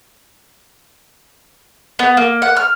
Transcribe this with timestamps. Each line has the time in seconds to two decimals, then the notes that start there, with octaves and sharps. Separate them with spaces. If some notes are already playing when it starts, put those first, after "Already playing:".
1.99 B3
2.17 A#3
2.42 F#5
2.57 F6